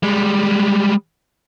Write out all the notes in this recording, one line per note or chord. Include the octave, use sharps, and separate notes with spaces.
G3 G#3